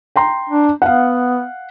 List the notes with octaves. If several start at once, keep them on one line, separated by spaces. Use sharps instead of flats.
G5 A#5 C6
D4
B3 F5 F#5